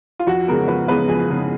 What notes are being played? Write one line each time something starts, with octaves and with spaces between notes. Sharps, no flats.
F4
F2 F#4
C#3 G#3 B3 A#4
F2 B4
C#3 G#3 B3 B4
F2 G#4
C#3 G#3 B3